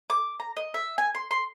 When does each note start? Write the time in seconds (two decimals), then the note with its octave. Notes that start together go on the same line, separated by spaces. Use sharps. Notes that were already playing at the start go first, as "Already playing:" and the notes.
0.10 D6
0.40 A#5
0.57 D#5
0.74 E5
0.98 G#5
1.15 C6
1.31 C6